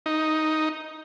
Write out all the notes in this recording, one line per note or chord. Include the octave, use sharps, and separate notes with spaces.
D#4